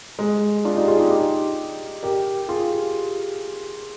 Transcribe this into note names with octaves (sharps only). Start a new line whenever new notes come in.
G#3
D4 F4
D#4 G4
F4 G#4
D#4 G4
D#4 G4
G4 A#4
F4 G#4